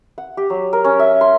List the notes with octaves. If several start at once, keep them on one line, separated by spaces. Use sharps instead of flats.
F#5
G4
F#3
A#4
C#4
E5
C6